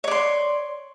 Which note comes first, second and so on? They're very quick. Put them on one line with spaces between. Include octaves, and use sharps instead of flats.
C#5 D5 C6